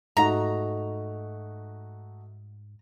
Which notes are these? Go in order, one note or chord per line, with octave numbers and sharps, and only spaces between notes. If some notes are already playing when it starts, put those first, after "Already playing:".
G#2 A3 D#4 F#4 A#5